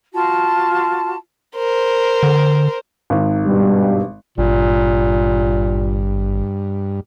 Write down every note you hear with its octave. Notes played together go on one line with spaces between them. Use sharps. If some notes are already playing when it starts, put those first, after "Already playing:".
F4 F#4 A5
A#4 C5
D3
G#1 D#3
G2 B2 G3
G#1 G2 A#2